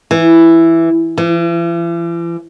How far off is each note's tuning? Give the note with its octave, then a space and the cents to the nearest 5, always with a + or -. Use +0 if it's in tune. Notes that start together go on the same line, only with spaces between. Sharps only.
E3 +5
E3 +45